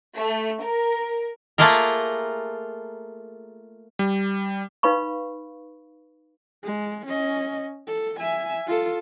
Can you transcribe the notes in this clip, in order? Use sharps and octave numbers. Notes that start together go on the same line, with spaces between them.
A3
A#4
A3 A#3 F4 G#4 A#4
G3
D#4 B4 F5 B5 C#6
G#3
C#4 D#5
A4
E5 G#5
F4 A4